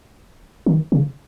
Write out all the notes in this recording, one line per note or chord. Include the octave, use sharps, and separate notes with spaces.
D#3
C#3